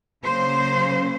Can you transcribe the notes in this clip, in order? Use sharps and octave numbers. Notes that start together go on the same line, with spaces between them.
C#3 F#3 A#3 C#4 C5